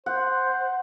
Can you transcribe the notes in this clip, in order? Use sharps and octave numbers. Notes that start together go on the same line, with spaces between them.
C5 F#5